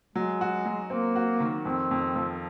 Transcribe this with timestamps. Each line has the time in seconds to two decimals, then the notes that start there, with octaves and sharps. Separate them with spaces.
0.16 F#3 G#3
0.41 F#4
0.66 F#3
0.90 A#3 C4
1.16 F#4
1.40 D#3
1.65 F2 C4
1.91 F2
2.16 F3